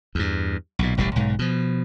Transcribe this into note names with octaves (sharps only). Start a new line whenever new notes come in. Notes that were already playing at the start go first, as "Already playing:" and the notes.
E2 G2
B1 A#2
E1 A1 E3 G3
B1 G#2
B2 F3